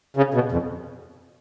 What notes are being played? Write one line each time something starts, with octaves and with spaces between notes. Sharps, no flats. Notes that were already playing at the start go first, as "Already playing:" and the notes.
C#3
B2
F2